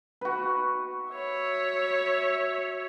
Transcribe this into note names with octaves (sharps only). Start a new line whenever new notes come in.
F#4 B4
C#5 E5